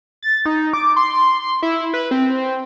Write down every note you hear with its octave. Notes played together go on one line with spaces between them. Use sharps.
A6
D#4
D6
C6
E4
B4
C4